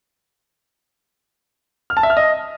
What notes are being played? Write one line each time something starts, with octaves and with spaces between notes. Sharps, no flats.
F6
A5
E5
F6
D#5